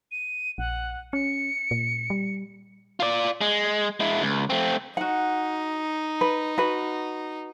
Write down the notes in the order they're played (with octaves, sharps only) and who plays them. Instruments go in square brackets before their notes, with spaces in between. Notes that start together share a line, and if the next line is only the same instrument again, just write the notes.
[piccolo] D#7
[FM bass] A#1 [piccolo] F#5
[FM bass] C#4 [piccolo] C#7
[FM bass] A#2
G3
[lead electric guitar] F4 D5
G#3
G#3 E4
C#2
A3 C4
[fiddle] D#4 [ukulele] F#4 F#5
[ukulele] B4
F#4 B4